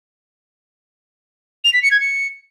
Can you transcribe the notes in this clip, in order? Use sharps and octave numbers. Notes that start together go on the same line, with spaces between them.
F7
B6
C#7
G#6
C#7